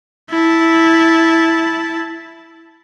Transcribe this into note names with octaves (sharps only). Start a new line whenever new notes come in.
E4 A5